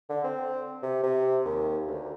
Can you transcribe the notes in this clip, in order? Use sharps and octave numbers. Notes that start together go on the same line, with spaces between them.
D3
C4
C3
C3
D#2
D2